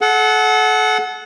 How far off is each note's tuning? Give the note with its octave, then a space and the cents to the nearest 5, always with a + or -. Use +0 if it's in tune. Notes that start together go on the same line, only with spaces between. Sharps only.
A4 -35 F#5 +0